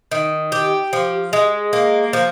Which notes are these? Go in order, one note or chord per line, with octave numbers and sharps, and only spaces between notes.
D#3
G4
F3
G#3
A#3
F3